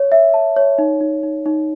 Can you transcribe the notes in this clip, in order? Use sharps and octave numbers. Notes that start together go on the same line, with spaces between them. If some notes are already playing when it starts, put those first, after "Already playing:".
Already playing: C#5
E5
A5
C#5
D#4
D#4
D#4
D#4